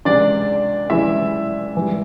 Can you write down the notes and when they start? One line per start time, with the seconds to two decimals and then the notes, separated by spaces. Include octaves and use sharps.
0.05 C#2 C3 E3 D4 D5
0.90 C#2 C3 E3 E4 E5
1.75 G#2 E3 G3